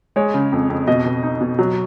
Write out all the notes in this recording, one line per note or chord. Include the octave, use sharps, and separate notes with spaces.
G#3 C#5
C#3
F2
F2
B2 D#5
B2
D#4
B2
F#3